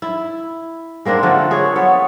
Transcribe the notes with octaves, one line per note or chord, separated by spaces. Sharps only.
E4
G#3 A#3 C4 D4
D3 F3 A3 A#3
F4 G#4 C#5
B3 A4 C#5